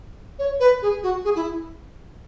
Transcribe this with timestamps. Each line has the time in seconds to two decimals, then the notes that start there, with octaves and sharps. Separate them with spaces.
0.39 C#5
0.60 B4
0.82 G#4
1.03 F#4
1.25 G#4
1.36 E4